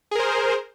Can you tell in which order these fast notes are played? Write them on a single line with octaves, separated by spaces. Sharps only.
G#4 A#4 C5